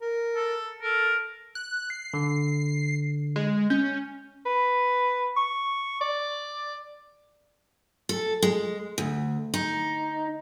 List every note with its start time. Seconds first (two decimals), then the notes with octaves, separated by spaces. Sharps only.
0.01 A#4
0.36 A4
0.82 A4 A#4
1.55 F#6
1.90 C7
2.14 D3
3.36 G#3
3.70 C#4 G6
4.46 B4
5.37 C#6
6.01 D5
8.09 A4
8.42 G#3
8.98 D2
9.54 D#4